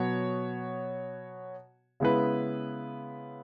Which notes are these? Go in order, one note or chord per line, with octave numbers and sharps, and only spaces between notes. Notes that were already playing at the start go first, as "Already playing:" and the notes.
Already playing: B2 F#3 B3 F#4 C#5
C#3 G#3 B3 E4 B4